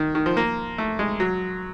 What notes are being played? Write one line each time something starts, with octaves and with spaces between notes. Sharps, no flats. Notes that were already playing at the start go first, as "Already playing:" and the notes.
Already playing: D#3
D#3
F3
A#3
A3
G#3
F#3